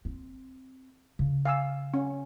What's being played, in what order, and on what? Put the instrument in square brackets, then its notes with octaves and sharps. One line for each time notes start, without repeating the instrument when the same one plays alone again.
[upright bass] C4
C#3
[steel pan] F5 G#5 E6
C#4